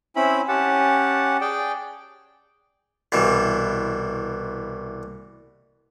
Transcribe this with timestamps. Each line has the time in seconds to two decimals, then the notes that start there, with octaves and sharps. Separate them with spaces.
0.16 C4 C#4 E4 B5
0.48 C#4 G4 F#5 A5
1.41 G#4 D5 G5
3.12 C2 B2 E3